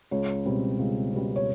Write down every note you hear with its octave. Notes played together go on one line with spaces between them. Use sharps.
C#2 C#5
B2 G3 C4
C#2
B2 G3 C4
C#5